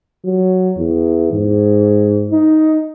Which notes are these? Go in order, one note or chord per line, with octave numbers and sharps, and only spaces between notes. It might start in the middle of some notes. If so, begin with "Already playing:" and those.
F#3
E2
G#2
D#4